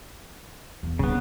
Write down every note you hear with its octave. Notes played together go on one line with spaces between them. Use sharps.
E2
G2 C#3 G3 B3